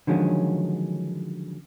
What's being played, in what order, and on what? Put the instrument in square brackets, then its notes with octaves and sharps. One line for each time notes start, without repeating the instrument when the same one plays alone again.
[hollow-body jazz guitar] D3 D#3 F3 F#3 G#3 C#4